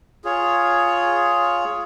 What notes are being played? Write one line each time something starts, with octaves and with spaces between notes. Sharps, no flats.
F4 G#4 C#5